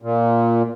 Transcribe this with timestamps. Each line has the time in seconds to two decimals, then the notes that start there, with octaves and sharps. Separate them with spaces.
0.02 A#2